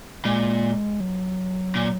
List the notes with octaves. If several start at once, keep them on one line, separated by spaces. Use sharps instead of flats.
A#2 G#3
F#3
A#2